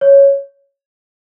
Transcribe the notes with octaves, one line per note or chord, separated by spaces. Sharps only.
C#5